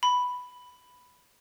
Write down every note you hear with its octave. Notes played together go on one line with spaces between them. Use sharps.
B5